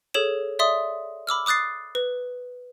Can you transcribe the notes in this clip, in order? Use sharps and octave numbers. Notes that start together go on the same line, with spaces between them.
G#4 A4 C#5 E7
D5 E5 C6 D#6
B5 D6 E6 F6
D6 D#6 F#6 A6 C7
B4